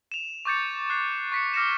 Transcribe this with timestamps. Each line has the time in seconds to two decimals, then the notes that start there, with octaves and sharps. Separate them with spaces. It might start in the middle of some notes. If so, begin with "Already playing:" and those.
0.12 E7 F7
0.45 C#6 D6 G6 A6 C#7
0.90 F#6 C7
1.32 C#6 B6 C#7
1.54 D6 F6 A#6 C#7 E7